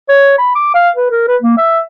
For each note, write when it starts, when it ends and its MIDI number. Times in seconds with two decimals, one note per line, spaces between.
0.09 0.37 73
0.38 0.51 83
0.55 0.70 86
0.75 0.90 77
0.96 1.10 71
1.11 1.26 70
1.28 1.36 71
1.42 1.57 58
1.57 1.81 76